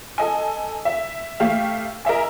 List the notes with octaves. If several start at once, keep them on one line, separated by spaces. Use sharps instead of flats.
A4 D#5 G#5
E5
A3 G4 E5 F5
A#4 D#5 E5 G#5